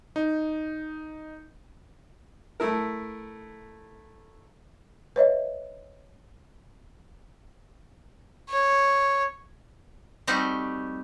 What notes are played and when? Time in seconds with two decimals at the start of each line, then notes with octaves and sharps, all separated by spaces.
0.16 D#4
2.60 A3 E4 A#4
5.16 B4 C#5 D#5 E5
8.49 C#5
10.27 G3 A3 C4 D#4 F#4 G4